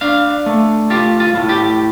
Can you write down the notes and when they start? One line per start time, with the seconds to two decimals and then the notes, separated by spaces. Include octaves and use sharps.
0.01 D4 F5
0.46 A3
0.90 F4 G4
1.20 F4
1.35 A2
1.49 G4